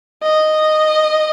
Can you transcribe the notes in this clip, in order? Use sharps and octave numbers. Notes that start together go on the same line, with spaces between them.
D#5